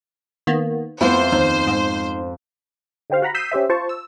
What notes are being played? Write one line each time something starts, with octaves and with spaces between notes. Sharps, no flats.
D#3 A#3 B3
F2 A3 B3 E4 C5
D#2 D#4
G#2
D3 D#4 G4 C5 F5
F#4 F#5 A#5 B5
D#6 E6 G6 B6 C7 D#7
C#4 G4 C5 E5
F4 C5 A5 C#6
E6